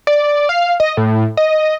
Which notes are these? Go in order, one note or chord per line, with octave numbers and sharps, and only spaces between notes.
D5
F5
D#5
A2
D#5